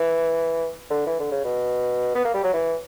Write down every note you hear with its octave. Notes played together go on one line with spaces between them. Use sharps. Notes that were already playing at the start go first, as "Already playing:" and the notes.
Already playing: E3
D3
E3
D3
C#3
B2
B3
A#3
G3
F#3
E3